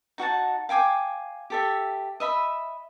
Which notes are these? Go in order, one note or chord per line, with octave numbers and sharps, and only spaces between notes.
D#4 F#4 F#5 A5
F5 G5 G#5 D6
G4 A4 E5
D#5 E5 B5